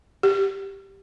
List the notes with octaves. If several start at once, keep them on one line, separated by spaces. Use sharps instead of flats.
G4